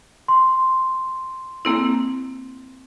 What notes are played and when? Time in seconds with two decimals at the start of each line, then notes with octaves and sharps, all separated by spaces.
0.28 C6
1.65 A#3 C4 E4